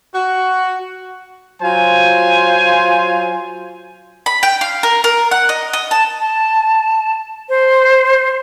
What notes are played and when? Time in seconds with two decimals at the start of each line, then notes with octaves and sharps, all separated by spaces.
0.15 F#4
1.62 F#3 F4 C5 G#5
4.26 B5
4.43 G5
4.61 F5
4.83 A#4
5.04 A#4
5.31 F#5
5.49 D#5
5.73 D#5
5.91 A5
6.19 A5
7.49 C5